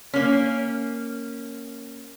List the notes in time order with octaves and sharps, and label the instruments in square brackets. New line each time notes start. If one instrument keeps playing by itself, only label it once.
[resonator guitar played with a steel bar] A#3 C#4